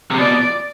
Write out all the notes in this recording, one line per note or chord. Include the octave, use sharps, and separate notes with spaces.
C3
B2 D5